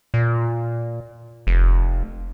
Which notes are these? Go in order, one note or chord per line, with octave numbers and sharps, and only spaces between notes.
A#2
F1